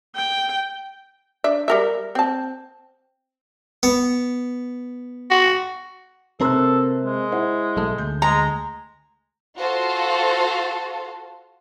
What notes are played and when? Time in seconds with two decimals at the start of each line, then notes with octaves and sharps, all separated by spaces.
0.15 G5
1.44 D4 E5
1.68 G3 A#4 E5
2.15 C4 A5
3.83 B3
5.31 F#4
6.41 C3 A#3 C4 A4 A#4 C5 F#6
7.03 G#3
7.32 E4 C5 F#5
7.77 B1 A3
7.98 D2 G6
8.22 G#3 A#5
9.58 F4 F#4 A4 C5 F5